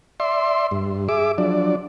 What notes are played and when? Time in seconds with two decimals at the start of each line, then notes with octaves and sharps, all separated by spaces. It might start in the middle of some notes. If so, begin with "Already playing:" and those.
0.20 D5 E5 C6
0.71 G2
1.09 G#4 E5 D6
1.38 F3 F#3 D4 D5